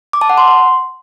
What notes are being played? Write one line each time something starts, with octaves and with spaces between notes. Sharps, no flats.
D6
A5
F#5
C6